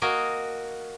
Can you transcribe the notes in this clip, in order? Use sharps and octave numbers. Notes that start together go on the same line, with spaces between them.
A#3 F#4 A#4 D#5 G#5